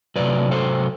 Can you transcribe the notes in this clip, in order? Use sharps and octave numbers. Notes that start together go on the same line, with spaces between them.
C3 F#3 B4 D5
A4 C5